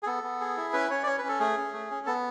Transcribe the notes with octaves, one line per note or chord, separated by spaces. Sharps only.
G#4
B3 A4
B3
G#4
E4
C#4 B4
C#4 C#5
D5
C#4 C#5
B4
C#4 A4
A3 G#4
C#4
A3
C#4
B3 A4